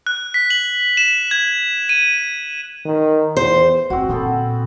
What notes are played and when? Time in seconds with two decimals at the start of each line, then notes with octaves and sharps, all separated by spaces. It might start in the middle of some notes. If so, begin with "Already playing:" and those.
0.07 F#6
0.34 B6
0.50 F#7
0.97 E7
1.31 G#6
1.89 D#7
2.85 D#3
3.37 E2 C5
3.90 E2 C4 F#4
4.09 A#2 D3 B3 C4 A4